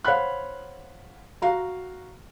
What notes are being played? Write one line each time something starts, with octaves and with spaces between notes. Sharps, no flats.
C5 C#5 F5 F#5 B5 F#6
F#4 F5 A#5